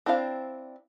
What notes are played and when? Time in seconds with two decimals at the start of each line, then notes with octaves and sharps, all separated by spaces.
0.06 C4 D4 E4 C5 F5